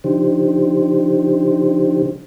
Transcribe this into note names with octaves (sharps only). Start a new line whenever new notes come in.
C#3 F3 D4 D#4 G4 C5